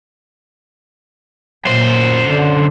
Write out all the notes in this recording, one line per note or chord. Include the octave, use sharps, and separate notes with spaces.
F#2 A#2 C5
D3